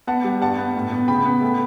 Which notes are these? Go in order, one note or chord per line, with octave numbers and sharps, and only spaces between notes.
B3 F#5 A5
G3
G2 F#5 A5
B3
A2
B3
C#3 G5 B5
B3
A3